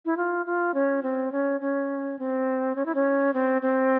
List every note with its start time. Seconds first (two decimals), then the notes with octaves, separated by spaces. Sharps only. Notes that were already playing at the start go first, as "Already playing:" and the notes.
0.05 E4
0.17 F4
0.46 F4
0.74 C#4
1.03 C4
1.32 C#4
1.61 C#4
2.19 C4
2.76 C#4
2.86 E4
2.95 C#4
3.34 C4
3.62 C4